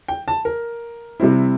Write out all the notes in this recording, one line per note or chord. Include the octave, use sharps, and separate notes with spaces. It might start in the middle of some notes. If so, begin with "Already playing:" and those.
G5
A5
A#4
C3 G3 C4 E4